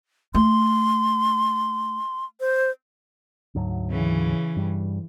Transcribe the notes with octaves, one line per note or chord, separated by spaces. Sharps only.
A3 C6
C5
D2 G#2 F#3
C#3 E3
G2 G3